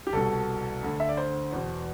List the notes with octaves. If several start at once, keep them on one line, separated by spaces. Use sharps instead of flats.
G4
C2 B2 A4
D2 D3
E5
D5
C5
E2 B2